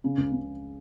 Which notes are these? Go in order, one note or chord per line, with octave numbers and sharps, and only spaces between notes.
C#3
C#2
C#3